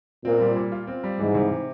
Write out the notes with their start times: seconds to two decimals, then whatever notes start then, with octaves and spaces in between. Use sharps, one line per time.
0.25 A#2 C4
0.40 G3
0.56 A#2
0.72 F4
0.87 C4
1.04 G3
1.19 G#2 E3
1.35 C3